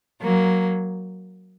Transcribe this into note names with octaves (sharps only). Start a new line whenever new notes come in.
F#3 A#3